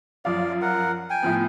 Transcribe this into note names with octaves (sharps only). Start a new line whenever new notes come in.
F#2 F3 D5 F5
A#4 F#5
G5 G#5
A2 F3 B3